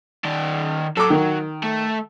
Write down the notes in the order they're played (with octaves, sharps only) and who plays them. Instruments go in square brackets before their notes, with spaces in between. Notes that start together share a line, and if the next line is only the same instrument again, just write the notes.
[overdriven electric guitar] D#3 D5
[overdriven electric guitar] F#3 [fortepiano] A4 D6
[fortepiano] D#3
[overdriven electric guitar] A3